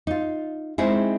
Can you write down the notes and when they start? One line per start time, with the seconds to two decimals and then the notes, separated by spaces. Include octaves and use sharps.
0.07 D#4 F4
0.78 G#3 C4 D#4 E4 G#4